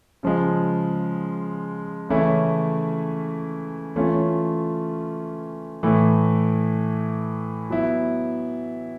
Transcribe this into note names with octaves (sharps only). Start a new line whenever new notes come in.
C#3 F3 G#3
C#3 E3 A3 C#4 E4
E3 A3 C#4 F4
A2 E3 A3
F#3 B3 E4